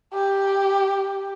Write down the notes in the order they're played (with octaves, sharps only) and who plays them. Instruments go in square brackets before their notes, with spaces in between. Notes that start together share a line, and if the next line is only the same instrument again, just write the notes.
[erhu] G4